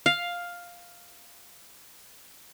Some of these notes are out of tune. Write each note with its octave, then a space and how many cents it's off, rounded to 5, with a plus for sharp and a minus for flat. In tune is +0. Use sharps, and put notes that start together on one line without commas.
F5 +5